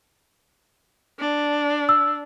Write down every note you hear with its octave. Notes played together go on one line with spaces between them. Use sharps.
D4
E6